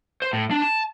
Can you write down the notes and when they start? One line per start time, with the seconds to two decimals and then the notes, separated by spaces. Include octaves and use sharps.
0.22 C5
0.33 A2
0.51 D4
0.62 A5